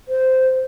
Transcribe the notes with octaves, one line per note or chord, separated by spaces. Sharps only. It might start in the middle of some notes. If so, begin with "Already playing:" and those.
C5